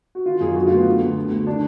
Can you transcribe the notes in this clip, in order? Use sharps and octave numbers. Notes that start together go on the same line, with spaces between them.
F#4
D#3 F4
F#2 G#4
D3 F#4
F4
D2
B3
D3
D2
D3
D2
D#3 D4